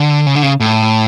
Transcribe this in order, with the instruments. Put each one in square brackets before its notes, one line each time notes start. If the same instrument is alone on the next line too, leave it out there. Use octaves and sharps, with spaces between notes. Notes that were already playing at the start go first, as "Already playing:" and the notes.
Already playing: [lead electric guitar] D3
C#3
D3
C#3
A2